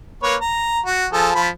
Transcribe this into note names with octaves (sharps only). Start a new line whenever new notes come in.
A#3 B4 C#5
A#5
F#4
F3 G#4 A4
F3 B5